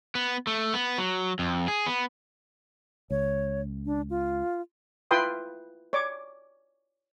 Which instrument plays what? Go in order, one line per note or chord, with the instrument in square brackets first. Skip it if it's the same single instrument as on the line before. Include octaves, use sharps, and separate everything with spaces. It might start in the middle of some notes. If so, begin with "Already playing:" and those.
[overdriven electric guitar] B3
A3
B3
F#3
F2
G#4
B3
[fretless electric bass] C#2 [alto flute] C#5
[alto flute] D4
F4
[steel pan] E4 F4 B4 G5 C6 D#6
C#5 D5 D6